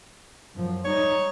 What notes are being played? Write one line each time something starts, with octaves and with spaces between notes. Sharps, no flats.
F#2 F3
G3 D#4 C#5